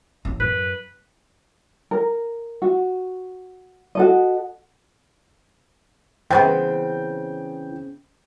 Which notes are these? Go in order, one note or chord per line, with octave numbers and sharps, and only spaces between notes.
A1
F#2 B4
A#4
F#4
F#4 A4 D#5
C#3 E3 B3 C4 G5